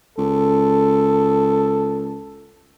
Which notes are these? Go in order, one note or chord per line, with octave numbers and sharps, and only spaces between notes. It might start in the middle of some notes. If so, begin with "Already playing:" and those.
C#2 A4